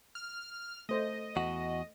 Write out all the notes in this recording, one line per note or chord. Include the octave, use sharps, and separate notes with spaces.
F6
A3 C5 D#5
E2 F#4